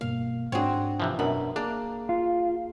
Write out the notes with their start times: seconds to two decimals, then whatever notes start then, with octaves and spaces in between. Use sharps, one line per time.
0.01 G2 B2 A#3 F5
0.52 G#2 C4 D4 F#4 G#4 C#5
1.00 C3 E3 F3
1.19 F#2 B2 D4 A#4 E5 B5
1.56 A#3 D4 G#4
2.09 F4